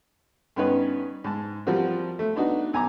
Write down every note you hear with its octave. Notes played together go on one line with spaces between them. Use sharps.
G2 B3 C#4 D#4 B4
G#2 A5
F3 G3 C4 F4 F#4 A#4
A3
B3 D4 D#4 F#4
B1 G#5 A#5 D6